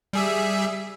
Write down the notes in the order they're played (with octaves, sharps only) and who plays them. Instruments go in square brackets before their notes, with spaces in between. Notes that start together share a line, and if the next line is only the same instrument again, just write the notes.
[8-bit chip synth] G3 G#4 E5